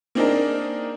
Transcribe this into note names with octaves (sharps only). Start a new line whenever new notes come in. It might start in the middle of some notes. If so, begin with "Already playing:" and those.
A#3 C4 D4 D#4 G#4 A#4